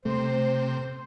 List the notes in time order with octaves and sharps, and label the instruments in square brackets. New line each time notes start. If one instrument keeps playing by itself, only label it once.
[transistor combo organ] C3 [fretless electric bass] A3 [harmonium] C5